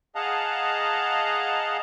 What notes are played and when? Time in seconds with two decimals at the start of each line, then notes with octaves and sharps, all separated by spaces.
0.15 G#4 D#5 F5 F#5 A5 A#5